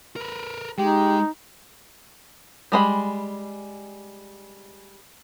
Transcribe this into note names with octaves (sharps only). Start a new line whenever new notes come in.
A#4 B4
G#3 D#4 G4
G3 G#3 B5